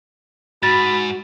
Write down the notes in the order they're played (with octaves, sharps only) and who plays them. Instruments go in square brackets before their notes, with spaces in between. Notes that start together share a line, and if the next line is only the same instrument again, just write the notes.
[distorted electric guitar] G#2 [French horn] F#4 [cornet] B5 [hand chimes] A6